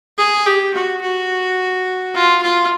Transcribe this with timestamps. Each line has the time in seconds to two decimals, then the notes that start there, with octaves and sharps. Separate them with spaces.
0.18 G#4
0.46 G4
0.73 F#4
1.01 F#4
2.14 F4
2.42 F4